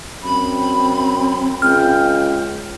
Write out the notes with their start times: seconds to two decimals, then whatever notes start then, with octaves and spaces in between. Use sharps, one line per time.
0.23 F#2 C4 B5
1.62 C#2 G5 F6